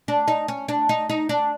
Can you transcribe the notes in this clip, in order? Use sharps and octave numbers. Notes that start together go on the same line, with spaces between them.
D4
D#4
C#4
D4
D#4
D#4
D4